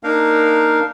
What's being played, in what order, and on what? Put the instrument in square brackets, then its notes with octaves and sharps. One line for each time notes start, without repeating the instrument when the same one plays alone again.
[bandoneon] A#3 D4 D#4 A#4 F5